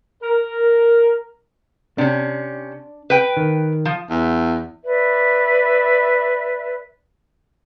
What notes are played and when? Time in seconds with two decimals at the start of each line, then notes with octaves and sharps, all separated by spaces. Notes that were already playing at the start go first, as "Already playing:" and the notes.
0.23 A#4
1.98 C3 C#4 D4
3.10 B4 G5
3.37 D#3
3.85 F3
4.10 E2
4.84 B4 D5 E5